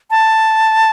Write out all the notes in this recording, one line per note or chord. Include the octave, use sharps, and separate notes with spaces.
A5